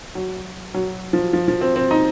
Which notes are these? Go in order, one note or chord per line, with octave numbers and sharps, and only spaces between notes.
F#3
F#3
F3
F3
F3
C4
C4
D#4